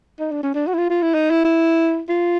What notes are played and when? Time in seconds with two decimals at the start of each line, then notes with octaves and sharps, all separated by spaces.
0.19 D#4
0.32 D4
0.43 C#4
0.55 D4
0.67 F#4
0.73 E4
0.78 F4
0.90 F4
1.02 E4
1.14 D#4
1.30 E4
1.45 E4
2.09 F4